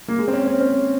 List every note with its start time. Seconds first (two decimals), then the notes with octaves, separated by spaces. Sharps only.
0.08 A#3
0.19 G#3
0.28 C4
0.33 C#4
0.47 C#4
0.61 C4